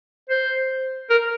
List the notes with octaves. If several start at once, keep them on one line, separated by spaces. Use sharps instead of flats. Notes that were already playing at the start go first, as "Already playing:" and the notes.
C5
A#4